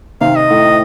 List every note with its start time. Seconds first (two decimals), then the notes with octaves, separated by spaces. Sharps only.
0.21 C3 D#3 F5
0.36 D#5
0.50 A2